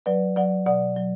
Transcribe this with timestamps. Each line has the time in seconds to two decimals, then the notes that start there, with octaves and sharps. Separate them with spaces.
0.06 F#3 B4 D5
0.36 F#3 D5 F#5
0.66 B2 D5 F#5
0.97 F#3